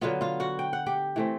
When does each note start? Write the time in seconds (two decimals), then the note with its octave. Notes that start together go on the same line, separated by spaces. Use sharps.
0.01 D3 F#3 B3 F4 F5
0.21 F4 F5
0.40 F#4 F#5
0.59 G5
0.73 F#5
0.86 G4 G5
1.16 E3 A3 C4